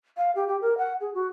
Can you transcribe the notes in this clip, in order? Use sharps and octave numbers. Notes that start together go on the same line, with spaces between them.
F5
G4
G4
A#4
F#5
G#4
F#4